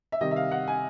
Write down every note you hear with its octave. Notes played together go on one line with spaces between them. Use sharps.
E5
C3 D#3 G3 D#5
E5
F5
F#5
G#5